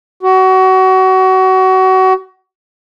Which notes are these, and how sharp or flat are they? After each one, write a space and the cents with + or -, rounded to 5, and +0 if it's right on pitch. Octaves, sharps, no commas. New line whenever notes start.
F#4 +25